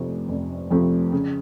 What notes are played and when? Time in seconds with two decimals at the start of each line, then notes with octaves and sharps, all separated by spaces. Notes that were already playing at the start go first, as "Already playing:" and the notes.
Already playing: F1 F2 C3 F3 A3
0.29 F1
0.71 F2 C3 F3 A3
1.12 C#3